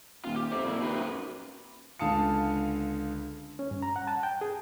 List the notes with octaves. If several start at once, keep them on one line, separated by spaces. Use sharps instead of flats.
D#1 F4
G4
F2 C5 E5
A#2 E4
D#2 A#3 C4 B4
F#2
C#2 D3 F5 A5 D#6 C#7
C#4
G2
A#5
F#5
A5
G5
G#4